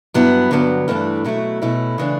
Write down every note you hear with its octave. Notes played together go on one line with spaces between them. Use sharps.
G2 F#3 B3 E4
G2 D3 F#3 B3
G2 E3 A3 D4
B2 F#3 A3 E4
B2 A3 C#4 E4
C#3 E3 A3 D4